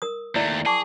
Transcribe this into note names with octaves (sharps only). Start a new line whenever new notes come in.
A#4 D#6
D#2 A3 E4 D5 E5
G#4 A5 C#6 D6